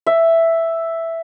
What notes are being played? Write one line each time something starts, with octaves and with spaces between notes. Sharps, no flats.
E5